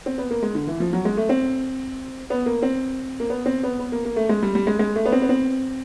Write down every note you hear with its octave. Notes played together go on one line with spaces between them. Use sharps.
C4
B3
A#3
G#3
D3
E3
F3
F#3
G#3
A3
C4
B3
A#3
C4
A#3
B3
C4
B3
B3
A#3
A#3
A3
G#3
G3
G3
G#3
G#3
A3
B3
C4
B3
C4